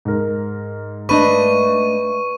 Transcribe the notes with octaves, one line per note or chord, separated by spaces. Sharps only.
G#2 A#4
A3 D4 B4 D#5 C#6 D#7